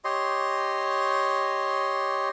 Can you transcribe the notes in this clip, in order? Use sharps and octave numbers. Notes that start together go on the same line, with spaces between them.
G4 C#5 D#5 C6